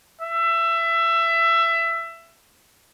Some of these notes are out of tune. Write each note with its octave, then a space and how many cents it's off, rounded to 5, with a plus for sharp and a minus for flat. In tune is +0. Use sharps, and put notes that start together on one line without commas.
E5 +20